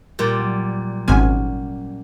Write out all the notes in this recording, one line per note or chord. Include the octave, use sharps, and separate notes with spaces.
A#2 G3
F#3
G#1 C3 C#4 F#5 G#5 F6